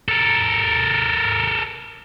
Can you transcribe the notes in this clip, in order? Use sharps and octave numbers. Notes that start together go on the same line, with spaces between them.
A4 A#4